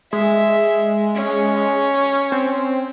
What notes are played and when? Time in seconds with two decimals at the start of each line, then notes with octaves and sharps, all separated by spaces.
0.13 G#3 E5
1.15 C#4
2.32 C4